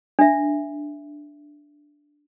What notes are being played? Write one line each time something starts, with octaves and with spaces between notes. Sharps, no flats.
D4 E5